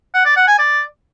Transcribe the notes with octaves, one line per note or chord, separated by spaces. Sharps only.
F#5
D5
F#5
G#5
D5